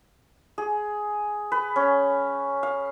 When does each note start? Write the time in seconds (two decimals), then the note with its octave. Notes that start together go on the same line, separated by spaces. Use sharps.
0.58 G#4
1.52 B4
1.76 C#4
2.63 F5